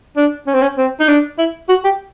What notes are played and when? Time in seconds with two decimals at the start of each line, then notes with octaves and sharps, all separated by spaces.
0.16 D4
0.47 C#4
0.54 C4
0.62 C#4
0.77 C4
1.00 D#4
1.09 D4
1.39 E4
1.69 F#4
1.84 G4